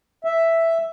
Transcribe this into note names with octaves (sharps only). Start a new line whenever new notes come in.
E5